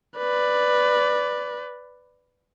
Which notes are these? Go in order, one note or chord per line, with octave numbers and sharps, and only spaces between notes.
B4 D5